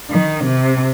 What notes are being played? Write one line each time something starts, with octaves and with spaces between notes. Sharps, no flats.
D#3
C3